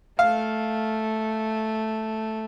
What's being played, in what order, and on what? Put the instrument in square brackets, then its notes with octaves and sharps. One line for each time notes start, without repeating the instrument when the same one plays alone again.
[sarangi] A3 [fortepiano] F5